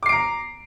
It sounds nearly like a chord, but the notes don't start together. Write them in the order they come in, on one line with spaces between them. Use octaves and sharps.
D6 C7 D7 A#5